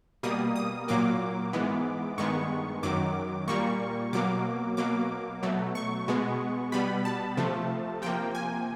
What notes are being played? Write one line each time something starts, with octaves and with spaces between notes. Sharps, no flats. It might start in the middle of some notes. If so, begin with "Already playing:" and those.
B2 G3 A#3 D#6
D#6
A#2 F#3 A#3 D6
G#2 E3 G#3 B3
G2 D#3 G#3 B3 C#6
F#2 D#3 F#3 D6
A#2 G3 A#3 C#6
B2 F#3 A#3 D6
B2 F#3 A#3 D6
B2 F#3 A3
C#6
B2 G#3 B3
B2 G3 B3 B5
A5
C3 F3 A3
C3 F3 A#3 G5
G#5